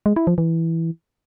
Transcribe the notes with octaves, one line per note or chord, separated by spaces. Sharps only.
G#3
E4
F3
E3